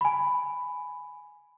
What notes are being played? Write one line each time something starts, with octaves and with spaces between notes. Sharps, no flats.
G#5 B5